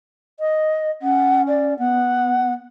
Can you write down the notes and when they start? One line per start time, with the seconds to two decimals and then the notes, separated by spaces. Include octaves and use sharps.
0.40 D#5
1.02 C#4 F#5
1.47 D5
1.79 B3 F#5